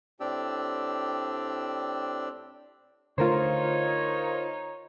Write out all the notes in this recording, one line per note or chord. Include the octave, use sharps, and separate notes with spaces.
A2 C4 D4 G4 D5 E6
D3 A3 D#4 F4 A#4 C5 C#5